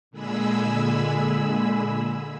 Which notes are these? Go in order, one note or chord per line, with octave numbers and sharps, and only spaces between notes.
A#2 D3 G#3 G#4 B5 E6